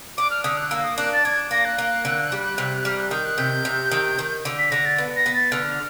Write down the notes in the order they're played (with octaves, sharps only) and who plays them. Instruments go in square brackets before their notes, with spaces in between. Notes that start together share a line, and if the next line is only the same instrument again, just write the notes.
[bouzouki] D4 [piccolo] D6
[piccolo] F6
[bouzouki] D3 [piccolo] D#6
[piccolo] F#6
[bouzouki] A#3 [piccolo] E6
[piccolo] D#6
[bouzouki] D4 [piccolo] F#6
[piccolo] A6
[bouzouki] D4 [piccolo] G#6
[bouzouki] A#3 [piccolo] A#6
[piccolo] F#6
[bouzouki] A#3
D3
G3
C3
[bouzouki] G3 [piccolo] F6
[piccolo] F#6
[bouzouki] D#3 [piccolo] G6
[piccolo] F#6
[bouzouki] C3 [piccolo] G6
[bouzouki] C3
D#3
D#3
D3
[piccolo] B6
[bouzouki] D3 [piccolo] A#6
[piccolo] A6
[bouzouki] B3
[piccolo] A#6
[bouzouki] B3
[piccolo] A6
[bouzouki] D3 [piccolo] F6